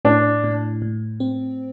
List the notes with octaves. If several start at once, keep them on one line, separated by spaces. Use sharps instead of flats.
A2 D4
A2
A2
C4